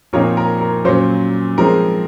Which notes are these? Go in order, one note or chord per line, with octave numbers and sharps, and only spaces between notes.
A#2 F3 C4 D#4 A#4 C#5
A#4
A#4
A#2 F#3 C#4 C5
G#2 F3 G#3 C4 A#4